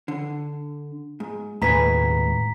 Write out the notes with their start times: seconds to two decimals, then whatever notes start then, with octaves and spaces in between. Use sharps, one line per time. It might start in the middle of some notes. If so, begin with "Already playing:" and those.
0.08 D3
1.20 G#2
1.62 D#2 A2 G#3 B4 G#5 A#5 B6